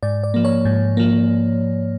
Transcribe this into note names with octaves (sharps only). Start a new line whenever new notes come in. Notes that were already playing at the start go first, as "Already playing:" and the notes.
G#2 D5
D5
F3 A#3
C#5
G#2
F3 A#3